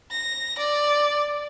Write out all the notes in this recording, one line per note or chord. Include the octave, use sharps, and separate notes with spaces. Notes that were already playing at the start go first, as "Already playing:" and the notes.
A#6
D5